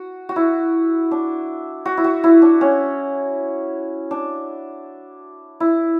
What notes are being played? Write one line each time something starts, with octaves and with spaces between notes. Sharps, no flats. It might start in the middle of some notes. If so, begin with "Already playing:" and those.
Already playing: F#4
F#4
E4
D4
F#4
E4
F#4
E4
D4
C#4
D4
E4